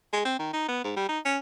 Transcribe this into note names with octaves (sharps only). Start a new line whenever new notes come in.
G#3
C4
D#3
D#4
B3
G#2
G3
D#4
C#4